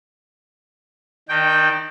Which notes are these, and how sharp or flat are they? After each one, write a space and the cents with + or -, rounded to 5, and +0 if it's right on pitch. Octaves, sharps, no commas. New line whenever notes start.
D#3 +0 D4 +35 G5 +0